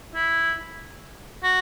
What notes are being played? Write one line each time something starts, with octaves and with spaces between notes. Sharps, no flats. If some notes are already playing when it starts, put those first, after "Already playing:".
E4
F#4